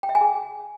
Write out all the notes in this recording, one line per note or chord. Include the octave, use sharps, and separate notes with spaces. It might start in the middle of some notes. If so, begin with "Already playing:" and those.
G5
E5
G#5
G#4